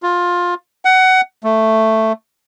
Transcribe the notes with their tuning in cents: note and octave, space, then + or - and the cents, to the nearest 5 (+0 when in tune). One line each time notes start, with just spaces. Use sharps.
F4 +15
F#5 +20
A3 +5